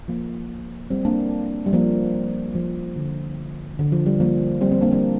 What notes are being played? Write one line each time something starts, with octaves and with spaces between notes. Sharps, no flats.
F3 A#3
G3 C4
A#3 D4
G3
F3 A#3
F3
D3
D3
F3
G3
F3 A#3
G3 C4
G3 C4
A#3 D4
G3 C4